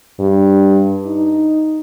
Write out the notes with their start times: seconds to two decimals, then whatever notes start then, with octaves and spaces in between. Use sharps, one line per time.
0.20 G2
1.07 D#4